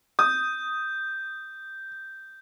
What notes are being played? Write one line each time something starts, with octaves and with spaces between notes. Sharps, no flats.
D#6 G6